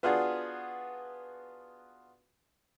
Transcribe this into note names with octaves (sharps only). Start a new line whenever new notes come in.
B3 D4 F4 F#4 G#4